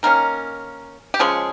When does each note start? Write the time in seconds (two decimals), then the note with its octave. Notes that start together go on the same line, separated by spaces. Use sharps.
0.03 D#3 A#3 C#4 A#4
1.14 G4
1.19 C#3 F3 G#3 C#4 G#4